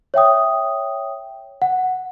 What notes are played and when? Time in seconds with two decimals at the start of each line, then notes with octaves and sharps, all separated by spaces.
0.14 C#5 E5 G5 D#6
1.62 F#5